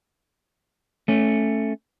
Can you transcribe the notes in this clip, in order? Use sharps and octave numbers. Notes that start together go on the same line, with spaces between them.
A3 C#4